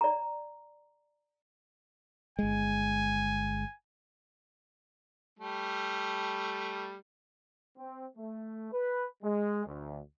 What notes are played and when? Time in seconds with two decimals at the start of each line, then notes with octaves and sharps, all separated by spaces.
0.01 D5 A#5
2.39 G1 G#3 G#5
5.39 G3 A3
7.77 C4
8.17 A3
8.72 B4
9.23 G#3
9.66 D2